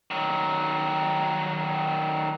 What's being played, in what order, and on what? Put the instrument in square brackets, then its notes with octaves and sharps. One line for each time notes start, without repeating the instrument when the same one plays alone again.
[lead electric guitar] D#3 F#3